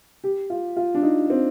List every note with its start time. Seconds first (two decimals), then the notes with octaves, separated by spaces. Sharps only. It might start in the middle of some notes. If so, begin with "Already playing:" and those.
0.24 G4
0.50 F4
0.77 F4
0.95 D4
1.03 D#4
1.30 C4